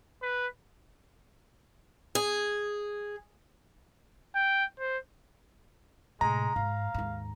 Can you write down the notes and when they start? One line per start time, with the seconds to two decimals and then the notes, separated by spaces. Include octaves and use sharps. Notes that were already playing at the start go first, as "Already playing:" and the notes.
0.22 B4
2.15 G#4
4.35 G5
4.79 C5
6.21 A2 C3 G#3 A#5
6.56 G#2 F5
6.94 D#2 G#2